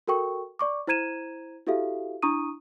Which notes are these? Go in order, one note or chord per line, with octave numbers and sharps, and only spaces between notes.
F#4 A4 A#4 G5 C#6
D5 C#6 D6
E4 C5 A#5 G#6 D#7 E7
E4 F#4 G4 A4 E5 F5
D4 E4 A#5 C#6 D#6 D#7